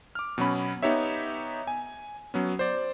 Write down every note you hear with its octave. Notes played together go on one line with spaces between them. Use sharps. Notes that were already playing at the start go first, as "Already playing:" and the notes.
D6 F6
B2 F#3 C#4 B5
B3 D#4 G4 C#5 E5
G#5
F#3 B3 C#4
C5 D5